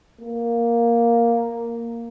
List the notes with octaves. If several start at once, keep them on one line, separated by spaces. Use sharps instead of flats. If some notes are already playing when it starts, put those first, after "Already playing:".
A#3